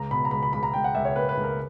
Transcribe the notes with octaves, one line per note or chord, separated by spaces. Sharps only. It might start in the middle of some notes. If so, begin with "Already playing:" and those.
Already playing: C#2 A#5
B2 B5
A#5
C#2 B5
B5
C#2 B5
A#5
C#2 G5
F#5
C#2 E5
C#5
A#3 B4
B4
C#2
A#4